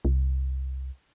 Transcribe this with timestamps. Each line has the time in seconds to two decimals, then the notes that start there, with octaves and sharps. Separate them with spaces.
0.05 C2